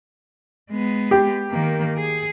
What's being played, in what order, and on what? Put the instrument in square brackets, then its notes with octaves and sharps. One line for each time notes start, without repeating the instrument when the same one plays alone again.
[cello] G#3 B3
[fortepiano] G4
[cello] D#3 A#3
G#4